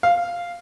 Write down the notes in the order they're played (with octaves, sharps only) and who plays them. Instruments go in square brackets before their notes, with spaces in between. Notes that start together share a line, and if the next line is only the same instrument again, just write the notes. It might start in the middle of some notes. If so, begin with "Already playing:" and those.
[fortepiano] F5